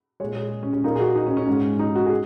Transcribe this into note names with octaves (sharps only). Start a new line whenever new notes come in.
A#2 G#3 C#5
G#4
C#4
C#4
A#2 A#3 D#4
G#4
F#4
D#4
C#4
C#4
G#2 G#3
D#4
F#4
G#4